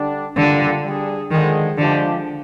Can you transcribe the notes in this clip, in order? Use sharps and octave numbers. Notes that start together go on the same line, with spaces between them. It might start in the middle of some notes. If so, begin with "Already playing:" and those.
Already playing: D3 G3 D4
D3 G3 A#3 D4 F4
G3 D4 G#4
D3 D#3 F3 G#3
D3 F3 G#3 D4 G4